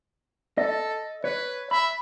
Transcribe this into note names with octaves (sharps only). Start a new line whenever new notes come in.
A4 D#5
B4 C#5
E5 B5